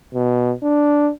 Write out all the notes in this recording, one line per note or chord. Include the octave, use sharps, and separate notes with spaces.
B2
D4